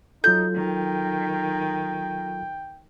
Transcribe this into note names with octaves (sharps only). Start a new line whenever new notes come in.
F#3 D#4 F4 A4 G6
D#3 G5